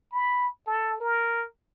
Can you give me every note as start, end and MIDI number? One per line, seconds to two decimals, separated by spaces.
0.12 0.47 83
0.67 0.97 69
1.00 1.45 70